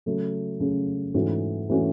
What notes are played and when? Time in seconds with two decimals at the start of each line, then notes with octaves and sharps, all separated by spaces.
0.06 C#3 F#3 A3
0.60 C#3 F#3 A3
1.14 G#2 E3 A3 C#4 F#4
1.69 E3 A3 C#4 F#4